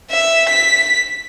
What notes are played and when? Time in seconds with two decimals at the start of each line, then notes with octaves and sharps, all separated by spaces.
0.10 E5
0.49 B6